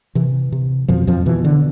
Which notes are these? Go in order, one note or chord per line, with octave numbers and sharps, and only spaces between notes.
C3 E3
C3
F2 B2 F3
F2 F3
B2 E3
D3